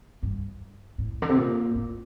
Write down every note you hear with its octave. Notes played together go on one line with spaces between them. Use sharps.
G2
A2
D3
C3
A#2
A2